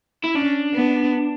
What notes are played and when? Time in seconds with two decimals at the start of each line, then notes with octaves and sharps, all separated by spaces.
0.24 E4
0.35 C#4 D4
0.74 B3